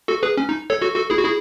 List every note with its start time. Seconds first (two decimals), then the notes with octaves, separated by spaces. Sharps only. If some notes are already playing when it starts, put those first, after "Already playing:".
0.08 F#4 A4
0.23 G#4 B4
0.37 C#4
0.49 D#4
0.70 A4 C#5
0.81 F#4 A4
0.95 F#4 A4
1.10 E4 G#4
1.18 F#4
1.25 E4 G#4